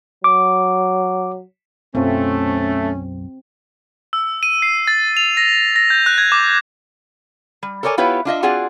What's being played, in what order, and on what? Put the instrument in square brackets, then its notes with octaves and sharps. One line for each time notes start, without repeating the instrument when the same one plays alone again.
[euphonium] F#3 [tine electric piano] D6
[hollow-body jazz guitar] B1 F#2 F4 [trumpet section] A3 [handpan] C4 [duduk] C#4
[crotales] E6
D#7
C7
A6
F7
A#6
A#6
G6
F#6
G#6
D6
[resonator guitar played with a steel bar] G3
A4 A#4 C#5 D5 G#5
B3 E4 F4 G4 B4 C#5
D4 F4 D#5 E5
C4 F4 F#4 G#4 D5 F#5